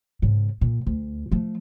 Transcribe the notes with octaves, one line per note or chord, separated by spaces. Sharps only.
G#2 C#3
A#2
D2
F3 A3